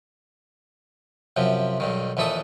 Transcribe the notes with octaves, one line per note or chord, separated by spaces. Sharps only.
F#2 C3 F3
B1 G2 D#3
A#1 D#2 E3 A4 E5 D#6